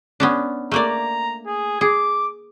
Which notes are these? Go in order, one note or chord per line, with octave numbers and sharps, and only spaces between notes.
B3 C#4 D4
A3 A#3 D5 A#5
G#4
G#4 D6